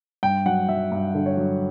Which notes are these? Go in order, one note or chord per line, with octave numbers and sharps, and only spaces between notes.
G2 G5
F#3 F#5
F#3 E5
G2
D3
C#5
F#3